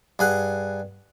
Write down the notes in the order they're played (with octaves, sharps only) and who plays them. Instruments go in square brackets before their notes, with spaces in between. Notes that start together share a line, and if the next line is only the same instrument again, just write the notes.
[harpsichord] G2 G#4 F#5